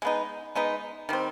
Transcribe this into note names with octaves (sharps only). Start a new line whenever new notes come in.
G#3 B3 D#4
G#3 B3 D#4
D#3 G3 C4